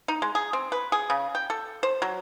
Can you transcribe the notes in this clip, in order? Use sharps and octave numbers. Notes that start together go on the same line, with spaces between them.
D#4
G#3
G#4
C4
B4
G#4
C#3
G5
A4
C5
F#3